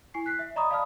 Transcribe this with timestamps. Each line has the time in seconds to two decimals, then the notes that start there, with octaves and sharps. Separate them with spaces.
0.14 E4 G#5 C#6 C7
0.26 F#6 B6 C7
0.39 E5
0.56 D5 D#5 A#5 B5 C#6 D#6
0.70 D5 F5 A5 B5 D#6 F6